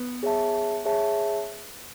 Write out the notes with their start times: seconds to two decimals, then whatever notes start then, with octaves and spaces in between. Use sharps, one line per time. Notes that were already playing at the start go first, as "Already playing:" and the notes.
Already playing: B3
0.23 G#4 C#5 E5 A5
0.85 G#4 C#5 E5 A5